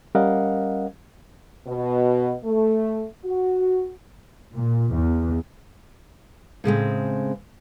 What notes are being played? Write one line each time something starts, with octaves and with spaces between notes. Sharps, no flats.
G3 C#4 A#4 D#5 F5 F#5
B2
A3
F#4
A#2
E2
A2 C#3 G#3 C4